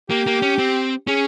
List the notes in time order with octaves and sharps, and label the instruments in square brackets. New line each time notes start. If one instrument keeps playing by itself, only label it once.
[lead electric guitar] A#3 [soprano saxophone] G4
[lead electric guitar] A#3
C#4
C4
[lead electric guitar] C#4 [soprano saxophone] G#4